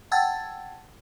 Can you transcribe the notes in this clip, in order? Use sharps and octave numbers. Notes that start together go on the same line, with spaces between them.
F#5 G5 A5 E6 G#6 A6